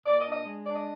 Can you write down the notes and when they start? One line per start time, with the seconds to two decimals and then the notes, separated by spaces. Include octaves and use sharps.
0.05 A#2 D5
0.18 D#5
0.25 D4
0.32 D#5
0.45 G#3
0.65 D4 D5
0.76 D#5